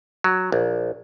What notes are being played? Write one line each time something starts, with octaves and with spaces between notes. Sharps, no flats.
F#3
A#1